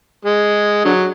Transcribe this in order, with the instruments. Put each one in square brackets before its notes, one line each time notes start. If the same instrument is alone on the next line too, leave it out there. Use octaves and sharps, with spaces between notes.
[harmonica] G#3
D3 F#3